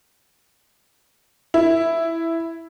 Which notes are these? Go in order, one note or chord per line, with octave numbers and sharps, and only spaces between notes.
E4